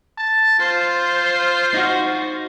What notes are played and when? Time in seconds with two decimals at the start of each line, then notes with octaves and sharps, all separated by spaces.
0.18 A5
0.59 F4 C5
1.74 D#4 F#4